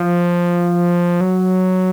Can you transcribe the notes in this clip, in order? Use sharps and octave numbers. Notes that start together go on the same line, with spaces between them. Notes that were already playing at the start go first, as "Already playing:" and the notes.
Already playing: F3
F#3